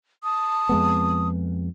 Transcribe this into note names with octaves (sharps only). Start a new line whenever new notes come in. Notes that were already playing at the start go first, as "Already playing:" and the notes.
A5 D#6
F2 G#3 B3